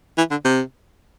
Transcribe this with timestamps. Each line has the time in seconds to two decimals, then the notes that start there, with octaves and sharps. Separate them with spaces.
0.18 E3
0.31 D3
0.45 C3